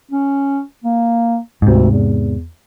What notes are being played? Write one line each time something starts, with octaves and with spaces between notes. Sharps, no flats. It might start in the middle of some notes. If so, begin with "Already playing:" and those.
C#4
A#3
D2 G#2 C3
E2